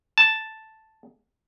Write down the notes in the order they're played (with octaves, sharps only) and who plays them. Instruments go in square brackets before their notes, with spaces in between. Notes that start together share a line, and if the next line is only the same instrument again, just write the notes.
[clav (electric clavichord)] A5